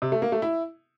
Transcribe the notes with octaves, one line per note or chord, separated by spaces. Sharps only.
C3
A3
A#3
A3
E4